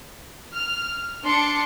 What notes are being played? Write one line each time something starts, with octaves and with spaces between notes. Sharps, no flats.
F6
D4 C6 D6 C#7